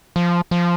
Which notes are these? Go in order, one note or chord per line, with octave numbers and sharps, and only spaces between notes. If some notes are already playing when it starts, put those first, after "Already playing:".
F3
F3